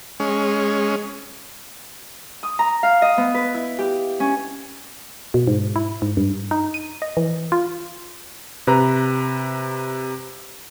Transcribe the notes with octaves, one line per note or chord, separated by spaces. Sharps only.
G#3 C#4
D#6
A#5
F5
D#5
B3
B4
E4
G4
C#4
B2
G#2
E4
G#2
G2
D#4
D#7
D#5
E3
F4
C3 B4 A#5